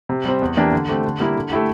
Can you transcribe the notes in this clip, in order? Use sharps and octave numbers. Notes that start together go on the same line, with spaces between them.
C3
G3 C4
E2
E3 A#3 D4 G4
D3
A3 C4 G4
D3
G3 A#3 E4
D3
A3 E4 G4